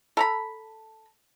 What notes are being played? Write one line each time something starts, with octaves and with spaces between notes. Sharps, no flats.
A4 A#5 B5